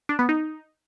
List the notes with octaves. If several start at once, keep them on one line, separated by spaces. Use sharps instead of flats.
D4
B3
D#4